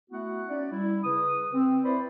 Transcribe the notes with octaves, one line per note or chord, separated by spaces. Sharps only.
A3 B3 E4 F#4 F#5
C#4 D#4 D5
G3 E4
C#3 B4 D#6
C4
E4 B4 C5 D5 B5